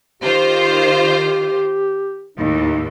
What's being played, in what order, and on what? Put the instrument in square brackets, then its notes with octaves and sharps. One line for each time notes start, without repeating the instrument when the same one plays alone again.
[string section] D#3 F4 C5 [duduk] G4
[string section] D#2 A2 [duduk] D#4